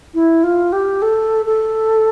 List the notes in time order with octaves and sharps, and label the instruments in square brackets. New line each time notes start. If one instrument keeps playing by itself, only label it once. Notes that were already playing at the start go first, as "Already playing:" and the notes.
[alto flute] E4
F4
G4
A4
A4